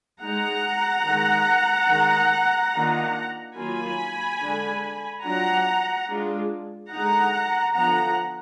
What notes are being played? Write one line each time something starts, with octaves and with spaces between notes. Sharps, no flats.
G#3 D#4 F#5 A#5
D#3 G#3 D#4
D#3 G#3 D#4
D#3 A#3 D4 F4
D#3 F#3 A#3 F4 G#5 B5
D3 G#3 D4
F#3 D4 F4 F#5 A#5
G#3 D4 F4
D3 G#3 D#4 F#5 A#5
D3 F3 B3 F#5 A#5